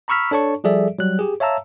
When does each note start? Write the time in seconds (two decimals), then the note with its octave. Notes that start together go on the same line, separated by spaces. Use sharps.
0.08 A#5 B5 C#6 E6 F6 B6
0.31 D4 A4 C#5 A5 C#6
0.64 F3 G3 G#4 A4 D5 E5
0.99 F#3 G3 F#6
1.19 G4 G#4
1.40 C#5 E5 F5 A5 A#5 E6